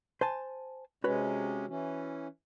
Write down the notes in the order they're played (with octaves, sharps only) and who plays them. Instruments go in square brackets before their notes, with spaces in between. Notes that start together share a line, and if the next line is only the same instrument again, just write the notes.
[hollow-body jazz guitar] C5 G#5 A5
[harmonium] C3 G#3 C#4 [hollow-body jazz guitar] F#4 B4 C#5
[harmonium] E3 C#4